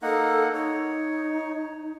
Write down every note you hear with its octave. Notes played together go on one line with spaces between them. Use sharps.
A#3 D#4 A4 F#5
D#4 C#5